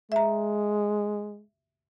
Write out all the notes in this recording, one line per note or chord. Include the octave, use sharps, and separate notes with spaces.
G#3 E5 A#5